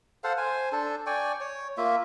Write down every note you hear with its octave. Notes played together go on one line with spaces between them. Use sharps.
A4 C5 F5 F#5
C5 G#5
D4 A4
D5 G5 G#5 C#6
C#5
A#3 F4 E5